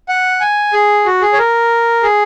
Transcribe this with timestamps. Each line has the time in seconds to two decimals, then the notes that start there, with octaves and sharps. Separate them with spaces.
0.09 F#5
0.41 G#5
0.73 G#4
1.06 F#4
1.22 G#4
1.33 C#5
1.38 A#4
2.03 G#4